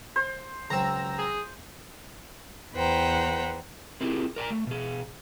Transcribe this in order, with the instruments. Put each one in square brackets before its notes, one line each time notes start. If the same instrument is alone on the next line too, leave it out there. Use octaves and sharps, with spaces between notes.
[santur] C5
[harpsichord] C#2 F#3 C4 [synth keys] A#5 E6
[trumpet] G#4
[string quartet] E2 B4 C5 F#5 G5 A#5
[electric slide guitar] C4 E4 F4 G4 G#4 A#4
A#4 D5 G#5 A#5
A3
B2 G#4